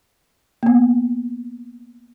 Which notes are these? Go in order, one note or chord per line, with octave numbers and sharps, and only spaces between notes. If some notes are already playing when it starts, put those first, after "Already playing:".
A#3 B3